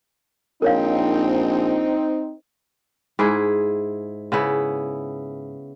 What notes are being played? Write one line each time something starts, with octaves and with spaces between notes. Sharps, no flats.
A#1 C4 D#4 A#4 C#5 F5
G#2 E4 G#4
C#3 B3 E4